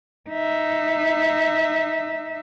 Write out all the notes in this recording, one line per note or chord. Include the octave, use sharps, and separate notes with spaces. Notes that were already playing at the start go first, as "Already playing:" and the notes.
D#4 E5